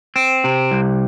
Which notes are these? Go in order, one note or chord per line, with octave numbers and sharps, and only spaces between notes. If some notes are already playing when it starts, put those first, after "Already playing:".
C4
C3
C2